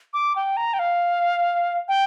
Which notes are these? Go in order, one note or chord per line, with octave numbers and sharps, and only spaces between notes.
D6
G5
A#5
G5
F5
G5